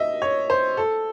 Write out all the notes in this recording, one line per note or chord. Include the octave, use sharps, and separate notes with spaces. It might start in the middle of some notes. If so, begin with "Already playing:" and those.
Already playing: D#5 E5
C#5
C5
A4